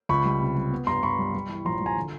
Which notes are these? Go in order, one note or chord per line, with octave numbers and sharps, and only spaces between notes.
C#2 B5 C#6
G3
C3
G3
B3
G2 A#5 C6
G2 B5 C#6
G3
G3
E3
A#1 A#5 C6
G3
G#5 A#5
D3